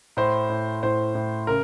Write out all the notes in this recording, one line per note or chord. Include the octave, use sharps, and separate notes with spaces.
A2 C5
A2
A2 C5
A2
C#3 A#4